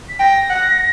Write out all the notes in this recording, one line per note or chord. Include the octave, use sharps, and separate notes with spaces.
B6
G5 A#6
F#5